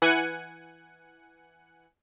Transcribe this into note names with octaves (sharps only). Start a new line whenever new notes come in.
E3 F#5 G#5 F#6 C#7